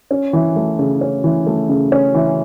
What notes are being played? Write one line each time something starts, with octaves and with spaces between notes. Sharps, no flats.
C#4
E3
A3
C#3
C#4
E3
A3
C#3
C#4
E3